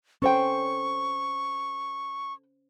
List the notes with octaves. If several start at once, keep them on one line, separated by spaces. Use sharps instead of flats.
C#4 A4 C5 G5 C#6